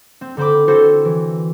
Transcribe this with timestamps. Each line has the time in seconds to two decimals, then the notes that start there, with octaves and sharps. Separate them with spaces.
0.21 C4
0.37 D3 C4 C5 B5 D6
0.68 C4 E4 F#4 A4 C5
1.05 E3